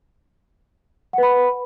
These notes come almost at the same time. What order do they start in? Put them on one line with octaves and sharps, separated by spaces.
F#5 B4 B5